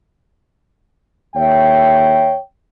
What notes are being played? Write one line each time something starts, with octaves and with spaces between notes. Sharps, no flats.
D#2 C#5 E5 G5